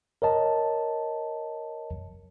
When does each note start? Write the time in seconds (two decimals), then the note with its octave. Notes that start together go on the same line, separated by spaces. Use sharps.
0.22 A#4 C#5 D#5 A5